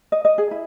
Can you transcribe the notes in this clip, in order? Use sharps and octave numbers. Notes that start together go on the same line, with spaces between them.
D#5
D#5
G#4
E4